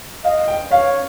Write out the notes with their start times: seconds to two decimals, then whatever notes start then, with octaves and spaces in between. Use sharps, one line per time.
0.24 D#5 F5
0.48 G5
0.71 C#5 F5